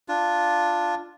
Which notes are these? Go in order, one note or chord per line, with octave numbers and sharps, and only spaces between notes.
D4 F4